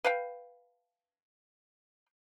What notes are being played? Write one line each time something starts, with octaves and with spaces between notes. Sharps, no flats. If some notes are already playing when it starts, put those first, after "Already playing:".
B4 F5 G5